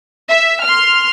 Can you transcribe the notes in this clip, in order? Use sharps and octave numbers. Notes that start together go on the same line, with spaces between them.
E5
C6 F6